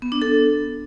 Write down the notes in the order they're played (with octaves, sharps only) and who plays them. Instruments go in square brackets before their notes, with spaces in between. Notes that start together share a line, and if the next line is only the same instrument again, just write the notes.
[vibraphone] B3
D4
A4